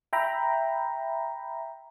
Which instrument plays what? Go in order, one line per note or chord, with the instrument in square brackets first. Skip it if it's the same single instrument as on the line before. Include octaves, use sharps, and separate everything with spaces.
[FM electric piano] E5 G5 A#5 B5